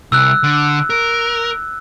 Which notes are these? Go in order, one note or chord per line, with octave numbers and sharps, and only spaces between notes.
C2 E6 F#6
D3
A#4